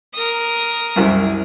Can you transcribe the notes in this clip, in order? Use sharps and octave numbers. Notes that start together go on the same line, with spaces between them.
A#4 D#6
C2 F#2